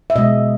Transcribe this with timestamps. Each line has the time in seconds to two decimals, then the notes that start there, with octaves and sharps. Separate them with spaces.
0.10 E5
0.15 B2 G#3 D#5